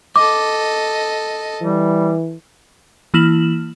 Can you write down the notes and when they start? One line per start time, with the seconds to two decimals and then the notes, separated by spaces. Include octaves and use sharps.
0.16 A4 D#5 D6
1.62 E3 G3
3.14 E3 A#3 E4 F6 E7 F#7